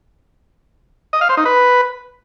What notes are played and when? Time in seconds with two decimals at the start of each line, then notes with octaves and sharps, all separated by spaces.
1.13 D#5
1.21 F5
1.29 C5
1.37 D#4
1.45 B4